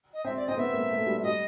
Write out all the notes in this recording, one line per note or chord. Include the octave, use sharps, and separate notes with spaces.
D#5
C4 E5
D5
C4 D#5
B3 E5
A#3
A3
G3
G3 D#5